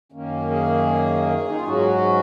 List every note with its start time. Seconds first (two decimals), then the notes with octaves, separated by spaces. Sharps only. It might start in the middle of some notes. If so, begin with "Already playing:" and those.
0.12 F#2 D#3 A#3 C#4
0.50 G#4
1.48 D#4
1.56 F4
1.64 G#2 F#3 C#4 F#4